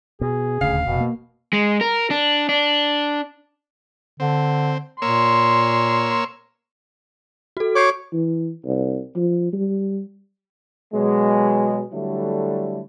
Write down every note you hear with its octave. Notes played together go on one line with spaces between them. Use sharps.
B2 G#4
D#1 D2 C#3 F5
F1 B2
A#3
G#3
A#4
D4
D4
D3 C4
A#2 A#3 C#5 C6 E6
F#4 A4
C#5 C#6 D6 G6 C7
E3
C2
F3
G3
B2 F#3 G#3
D3 F#3 G3 A3 E4